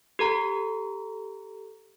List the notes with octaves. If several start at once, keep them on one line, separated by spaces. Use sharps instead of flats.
G4 A4 A#5